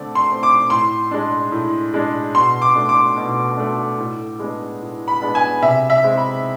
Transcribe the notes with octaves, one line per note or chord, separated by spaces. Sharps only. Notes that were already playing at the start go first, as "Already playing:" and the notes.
Already playing: D3 A3 C4 D5
C6
A3 C4
D6
A2 C6
G#3 D4
A2
G#3 D4
B2 C6
D6
A3 D4
D6
B2
A3 D4
A2
G#3 B3 D4
A2
B5
G#3 B3 D4
G#5
C3 E5
E5
G#3 C4
B5